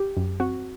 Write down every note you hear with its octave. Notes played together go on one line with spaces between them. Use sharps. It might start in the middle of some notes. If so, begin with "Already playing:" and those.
Already playing: G4
F#2
C4 F#4